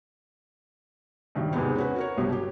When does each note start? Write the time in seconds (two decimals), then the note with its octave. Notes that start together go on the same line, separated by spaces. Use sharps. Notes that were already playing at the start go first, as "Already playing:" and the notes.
1.35 A#1 G2 D#3 F#3
1.53 E2 G#2 C3 G#3 B3 D#4
1.76 C#4 F#4 B4
1.96 F#4 A#4 C#5
2.17 G1 C2 B2 F#3
2.32 G4